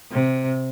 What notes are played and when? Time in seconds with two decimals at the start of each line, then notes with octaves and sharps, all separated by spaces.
0.12 C3